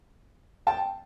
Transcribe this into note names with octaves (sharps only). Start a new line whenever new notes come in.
G5 A5